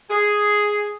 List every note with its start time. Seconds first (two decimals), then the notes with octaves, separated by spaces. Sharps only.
0.10 G#4